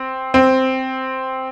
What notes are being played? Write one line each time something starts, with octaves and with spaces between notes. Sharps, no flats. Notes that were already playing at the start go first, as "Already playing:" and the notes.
Already playing: C4
C4